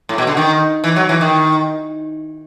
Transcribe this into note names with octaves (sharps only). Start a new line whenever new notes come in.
A2
B2
D3
D#3
E3
F#3
E3
D#3